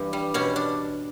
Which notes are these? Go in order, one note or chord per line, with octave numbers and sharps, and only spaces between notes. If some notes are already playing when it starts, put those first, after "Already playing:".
Already playing: G2 E3
G3
B2 C#4
D4